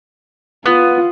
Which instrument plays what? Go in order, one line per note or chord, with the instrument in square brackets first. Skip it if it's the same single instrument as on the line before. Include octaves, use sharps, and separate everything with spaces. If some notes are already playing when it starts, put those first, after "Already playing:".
[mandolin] B3 [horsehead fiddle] F4